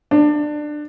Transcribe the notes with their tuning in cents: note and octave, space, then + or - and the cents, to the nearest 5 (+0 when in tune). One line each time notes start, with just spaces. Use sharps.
D4 +20